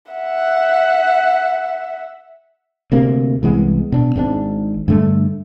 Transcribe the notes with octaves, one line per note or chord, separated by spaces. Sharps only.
E5 F#5
D2 C3 A#3
C2 E3 G#3 B3
B2 D4
G#1 G#2 C#3 D4
G2 D3 A3